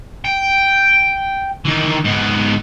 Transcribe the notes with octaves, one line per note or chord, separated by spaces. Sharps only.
G5
D#3 E3
G#2 B3